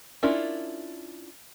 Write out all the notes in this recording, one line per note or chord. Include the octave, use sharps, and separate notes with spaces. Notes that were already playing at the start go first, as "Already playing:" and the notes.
C#4 D4 E4 F4 A#4